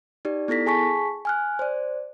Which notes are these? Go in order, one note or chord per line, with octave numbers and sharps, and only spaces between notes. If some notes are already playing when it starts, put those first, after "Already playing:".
D#4 G4 D5
B3 E4 A4 A#6 B6
G#4 G#5 A5 C#6 B6
G#5 F6 F#6
C5 D5